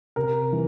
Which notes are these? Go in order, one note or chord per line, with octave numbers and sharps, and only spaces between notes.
C3 A#4
E3